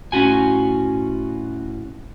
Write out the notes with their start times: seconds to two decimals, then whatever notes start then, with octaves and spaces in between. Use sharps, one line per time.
0.12 A2 C#4 F4 F#4 G#5